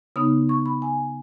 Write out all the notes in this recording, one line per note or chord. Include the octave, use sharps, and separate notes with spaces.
C#3 B3 D#4 D#6
C#6
B5
G#5